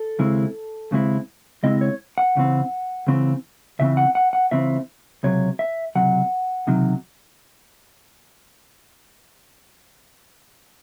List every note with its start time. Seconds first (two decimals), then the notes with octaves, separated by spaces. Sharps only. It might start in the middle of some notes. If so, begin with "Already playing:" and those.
Already playing: A4
0.19 D#2 C#3 G#3 C4 E4
0.91 D#2 C#3 G#3 C4 E4
1.63 D#2 C#3 G#3 C4 E4 D#5
1.81 C#5
2.18 F#5
2.35 C#2 C#3 E3 C4
3.07 C#2 C#3 E3 C4
3.79 C#2 C#3 E3 C4 E5
3.97 F#5
4.15 F#5
4.33 F#5
4.51 C#2 C#3 E3 C4 E5
5.23 C#2 C3 F#3 C#5
5.59 E5
5.95 C#2 C3 F#3 F#5
6.67 C#2 C3 D#3 F#3